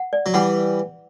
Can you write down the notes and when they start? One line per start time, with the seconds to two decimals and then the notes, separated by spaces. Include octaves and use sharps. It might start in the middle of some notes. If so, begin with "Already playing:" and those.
Already playing: F#5
0.13 D5
0.26 F#3
0.34 E3 G3 F#5